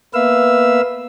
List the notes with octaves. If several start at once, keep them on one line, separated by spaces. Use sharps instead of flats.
A#3 B3 B4 E5 F5 E6